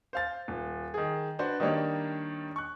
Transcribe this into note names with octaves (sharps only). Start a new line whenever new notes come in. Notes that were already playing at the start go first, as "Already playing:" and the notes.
C5 F5 A6
D#1
D#3 G#4
D4 F#4 B4 C5
D#3 G3 A#3 D4 D#4 C#5
C#6 F#6